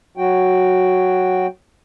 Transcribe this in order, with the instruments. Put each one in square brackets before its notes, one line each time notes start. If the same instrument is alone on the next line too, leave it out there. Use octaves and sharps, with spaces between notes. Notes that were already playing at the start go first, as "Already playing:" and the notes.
[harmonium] F#3 F#4 G5